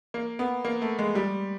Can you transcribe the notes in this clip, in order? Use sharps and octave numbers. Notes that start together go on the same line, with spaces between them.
A#3
B3
A#3
A3
G#3
G3